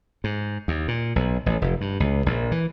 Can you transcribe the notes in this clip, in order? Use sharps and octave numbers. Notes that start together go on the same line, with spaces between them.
G#2
D#2
A#2
B1
A1
F1
G2
C#2
A#1
E3